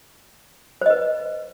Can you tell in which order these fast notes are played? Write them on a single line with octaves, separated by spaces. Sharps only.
C5 D#5 B4